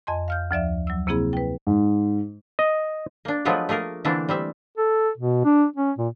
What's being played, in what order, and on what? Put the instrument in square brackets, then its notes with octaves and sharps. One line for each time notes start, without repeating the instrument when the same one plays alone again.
[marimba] F2 D#5 G#5 C6
F5 F6 G6
D2 F3 D5 E5
F#3 E6
C3 A#3 C4 E4 G#4 B5
B4 G5
[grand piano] G#2
[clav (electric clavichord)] D#5
[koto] A#3 D4
F3 F#3 G#3 A3 B3 F4
A3 A#3 G#4 A#4
D3 E3 A3 A#3 C4 D4
G3 C4 E5
[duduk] A4
B2
D4
C#4
A#2